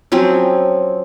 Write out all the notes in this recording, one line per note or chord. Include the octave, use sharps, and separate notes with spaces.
F3 F#3 C4 C#4